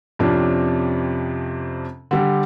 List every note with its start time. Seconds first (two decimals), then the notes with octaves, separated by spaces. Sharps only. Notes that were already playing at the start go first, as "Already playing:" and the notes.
0.19 F2 C3 F3 C#4 D4
2.11 D3 G3 G4